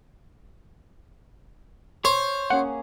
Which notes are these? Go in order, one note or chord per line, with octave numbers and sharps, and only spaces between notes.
C5 C#5
A#3 C#4 G#4 F#5